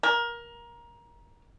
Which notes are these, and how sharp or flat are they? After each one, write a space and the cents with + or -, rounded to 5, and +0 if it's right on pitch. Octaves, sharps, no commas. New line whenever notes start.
A#4 +20